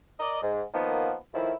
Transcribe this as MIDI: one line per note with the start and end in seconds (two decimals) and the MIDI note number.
0.20 0.41 70
0.20 0.41 74
0.20 0.41 75
0.42 0.62 44
0.74 1.14 51
0.74 1.14 53
0.74 1.14 58
0.74 1.14 59
1.34 1.53 45
1.34 1.53 51
1.34 1.53 53
1.34 1.53 64